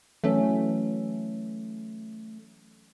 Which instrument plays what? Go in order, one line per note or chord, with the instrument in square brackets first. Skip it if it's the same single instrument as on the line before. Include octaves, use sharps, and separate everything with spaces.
[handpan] E3 F#3 C#4 [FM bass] A3